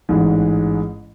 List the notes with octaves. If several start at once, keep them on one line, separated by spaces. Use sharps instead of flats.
A1 G#2 G#3